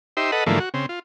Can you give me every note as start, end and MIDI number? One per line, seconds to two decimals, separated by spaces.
0.17 0.31 63
0.17 0.31 67
0.17 0.31 72
0.17 0.31 76
0.32 0.44 69
0.32 0.44 71
0.32 0.44 75
0.32 0.44 78
0.46 0.59 44
0.46 0.59 50
0.46 0.59 52
0.46 0.59 53
0.46 0.59 57
0.46 0.59 58
0.60 0.69 66
0.74 0.86 49
0.74 0.86 60
0.89 0.99 65